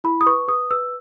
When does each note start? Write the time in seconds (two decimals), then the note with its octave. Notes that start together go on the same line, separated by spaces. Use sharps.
0.04 E4 B5
0.21 D#6
0.26 B4 C#6
0.48 B4 D#6
0.70 B4 E6